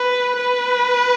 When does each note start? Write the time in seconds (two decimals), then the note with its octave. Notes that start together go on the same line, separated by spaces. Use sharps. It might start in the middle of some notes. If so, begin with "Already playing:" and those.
Already playing: B4
0.37 B4